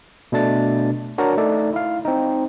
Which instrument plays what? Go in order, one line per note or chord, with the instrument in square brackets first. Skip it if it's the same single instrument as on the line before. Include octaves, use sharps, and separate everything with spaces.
[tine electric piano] B2 A3 D4 A6
D4 F#4 A#4 C#5 D5 A#5
A3 D#4 A4 D5
E4 F5
C4 D#4